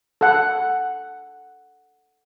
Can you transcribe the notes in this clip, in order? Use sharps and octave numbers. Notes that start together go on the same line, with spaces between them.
A4 F#5